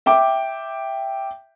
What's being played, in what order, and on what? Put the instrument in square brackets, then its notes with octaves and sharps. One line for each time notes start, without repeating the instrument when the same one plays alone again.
[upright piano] E5 G5 D6